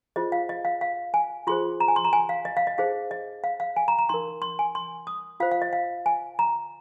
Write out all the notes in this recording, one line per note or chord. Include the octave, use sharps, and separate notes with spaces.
F4 G#4 C5 D#5
F5
D#5
F5
F5
G#5
F4 G#4 C5 C6
A#5
G#5
C6
A#5
G#5
F5
D#5
F5
D#5
D#4 G#4 C5 F5
D#5
F5
F5
G#5
A#5
A#5
D#4 A#4 C6
C6
G#5
C6
D#6
F4 C5 F5
F5
D#5
F5
G#5
A#5